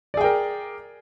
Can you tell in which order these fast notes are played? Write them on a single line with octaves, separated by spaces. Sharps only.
D5 G#4 G5 A#4